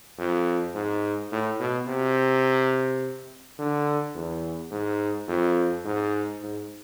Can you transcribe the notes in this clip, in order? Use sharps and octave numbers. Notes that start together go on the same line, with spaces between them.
F2
G#2
A2
B2
C3
D3
E2
G#2
F2
G#2
G#2